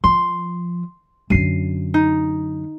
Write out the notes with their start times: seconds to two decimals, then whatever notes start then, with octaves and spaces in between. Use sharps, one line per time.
0.04 F3 C6
1.30 F#2 D3 C7 D#7
1.94 D#4